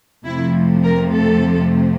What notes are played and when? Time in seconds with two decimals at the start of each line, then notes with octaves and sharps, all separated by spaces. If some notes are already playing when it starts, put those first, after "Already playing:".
0.25 F2 C3 F3 A3 E4
0.84 A#4
1.13 A4